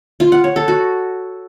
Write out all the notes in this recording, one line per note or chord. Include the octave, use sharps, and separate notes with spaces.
F4
F#5
C#5
A4
F#4